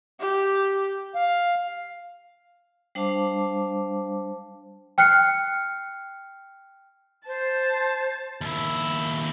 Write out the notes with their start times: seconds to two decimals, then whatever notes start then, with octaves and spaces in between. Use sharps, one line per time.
0.20 G4
1.15 F5
2.95 G3 D4 C5 F5 A5 D6
4.98 G5 F6 F#6 C7 C#7
7.27 C5 A5
8.41 D#2 E4